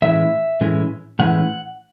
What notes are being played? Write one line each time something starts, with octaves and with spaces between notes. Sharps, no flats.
A2 E3 G#3 C#4 E4 E5
A2 E3 G#3 C#4 E4
A2 E3 G#3 C#4 E4 F#5